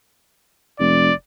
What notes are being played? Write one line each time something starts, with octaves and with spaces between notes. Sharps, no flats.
F1 D5